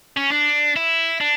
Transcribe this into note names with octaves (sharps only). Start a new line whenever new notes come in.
C#4
D4
E4
D4